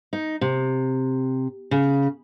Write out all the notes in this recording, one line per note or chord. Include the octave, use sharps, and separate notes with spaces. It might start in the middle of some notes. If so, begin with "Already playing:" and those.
D#4
C3
C#3